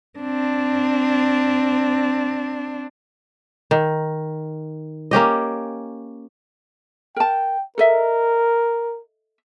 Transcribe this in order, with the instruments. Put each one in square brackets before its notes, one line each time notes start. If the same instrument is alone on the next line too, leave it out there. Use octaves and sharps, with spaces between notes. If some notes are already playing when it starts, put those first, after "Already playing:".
[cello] C4 D4
[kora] D#3
A#3 C#4 G4 D#5
[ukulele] A#4 A5 [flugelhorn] G5
[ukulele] A4 D#5 E5 [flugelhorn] A#4